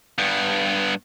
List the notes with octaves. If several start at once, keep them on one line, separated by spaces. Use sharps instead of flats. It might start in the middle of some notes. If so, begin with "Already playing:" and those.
G2 B3